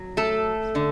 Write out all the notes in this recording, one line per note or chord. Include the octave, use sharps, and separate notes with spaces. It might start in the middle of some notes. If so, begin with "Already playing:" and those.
Already playing: F#3
A3 A4
D3